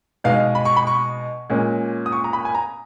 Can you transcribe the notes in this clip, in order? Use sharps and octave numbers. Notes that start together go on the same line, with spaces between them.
B2 G#3 D#4 F5
B5
C#6
B5
C#6
A#2 G#3 C#4
D#6
C#6
A#5
B5
G#5
A#5